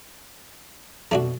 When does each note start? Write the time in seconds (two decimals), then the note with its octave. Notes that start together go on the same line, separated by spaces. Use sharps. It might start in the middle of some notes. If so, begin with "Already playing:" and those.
1.11 F2 B2 A3 D4 F#4